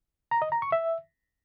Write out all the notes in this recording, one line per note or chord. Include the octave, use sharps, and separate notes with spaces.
A#5
D#5
A#5
C#6
E5